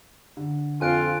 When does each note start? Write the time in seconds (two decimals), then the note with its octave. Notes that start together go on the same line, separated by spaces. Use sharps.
0.37 D3
0.81 F2 F4 G#5 F#6 D7